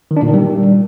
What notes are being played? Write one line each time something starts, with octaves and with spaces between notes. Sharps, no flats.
D#3
D4
A#2
D#3
G3